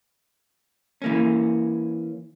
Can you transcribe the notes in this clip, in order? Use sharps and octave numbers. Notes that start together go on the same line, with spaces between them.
E3 A#3 C#4